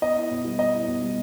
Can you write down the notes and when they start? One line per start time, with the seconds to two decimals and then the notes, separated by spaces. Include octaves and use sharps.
0.02 B3 D#5
0.16 E4
0.31 B2
0.44 G3
0.59 B3 D#5
0.73 E4
0.87 B2
1.02 G3